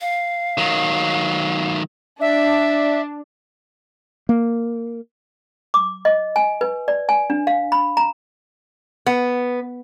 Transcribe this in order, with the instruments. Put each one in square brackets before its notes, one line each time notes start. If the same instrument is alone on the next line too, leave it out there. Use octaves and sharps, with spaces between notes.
[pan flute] F5
[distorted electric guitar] D#3 F#3
[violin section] D4 [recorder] E5
[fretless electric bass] A#3
[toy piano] D6
D#5
G#5
B4
D5
G#5
D4
F5
B5
A#5
[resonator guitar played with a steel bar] B3